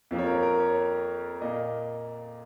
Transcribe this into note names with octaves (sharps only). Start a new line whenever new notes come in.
F2 F3 A#3
C#5
A#4
A#4
C#5
A#2 A#3 D#5